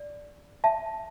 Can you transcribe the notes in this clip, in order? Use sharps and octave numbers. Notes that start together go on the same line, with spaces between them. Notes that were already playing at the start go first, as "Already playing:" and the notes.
Already playing: D5
E5 A5